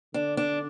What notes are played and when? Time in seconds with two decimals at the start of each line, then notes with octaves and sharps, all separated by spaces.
0.14 D3 D4
0.37 D4